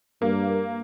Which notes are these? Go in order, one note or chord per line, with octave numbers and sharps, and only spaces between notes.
G2 A#3